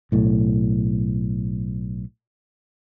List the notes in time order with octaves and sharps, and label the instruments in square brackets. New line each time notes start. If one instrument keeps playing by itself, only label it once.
[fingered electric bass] B1 A2